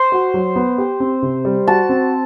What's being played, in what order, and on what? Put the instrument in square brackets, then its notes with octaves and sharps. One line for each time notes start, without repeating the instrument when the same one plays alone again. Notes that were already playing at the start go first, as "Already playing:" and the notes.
Already playing: [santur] C5
[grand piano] F#4
F#3
B3
G4
C4
C3
G3
[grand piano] F#4 [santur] A5
[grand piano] C4